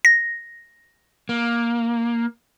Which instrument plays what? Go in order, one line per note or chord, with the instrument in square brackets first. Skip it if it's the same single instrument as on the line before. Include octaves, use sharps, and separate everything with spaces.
[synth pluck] A#6
[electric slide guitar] A#3